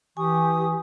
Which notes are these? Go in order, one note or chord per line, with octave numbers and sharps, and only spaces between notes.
E3 G4 G#5 C#6 D#6